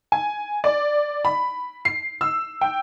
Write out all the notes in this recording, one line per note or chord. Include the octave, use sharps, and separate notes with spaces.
G#5
D5
B5
C7
E6
G5